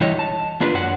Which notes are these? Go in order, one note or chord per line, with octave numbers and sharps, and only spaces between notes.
E3 G3 E4 C#5 D#5
A5
A#3 D4 F4 B4 D5
F#2 F#3 D5 F#5